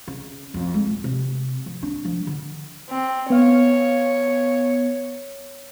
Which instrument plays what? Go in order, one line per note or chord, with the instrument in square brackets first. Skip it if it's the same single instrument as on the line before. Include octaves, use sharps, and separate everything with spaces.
[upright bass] C#3
F2
G#3
D1
C3
F3
D4
F3
D3
[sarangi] C4
[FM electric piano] B3 F5 [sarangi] C#5